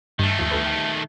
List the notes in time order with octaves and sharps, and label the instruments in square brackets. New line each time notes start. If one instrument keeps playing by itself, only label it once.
[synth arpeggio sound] G2 [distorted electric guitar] D#3 A3
[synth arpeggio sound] D#2 F3
D2 A4 B4
G4